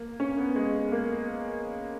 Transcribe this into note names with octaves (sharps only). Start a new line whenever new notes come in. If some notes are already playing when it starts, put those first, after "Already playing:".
Already playing: A#3
C#4
B3
G#3
A#3